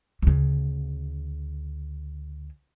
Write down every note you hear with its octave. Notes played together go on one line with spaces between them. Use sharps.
D2 C#3